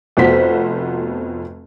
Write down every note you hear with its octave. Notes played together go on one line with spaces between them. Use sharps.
F1 F2 B3 F#4 C5 B6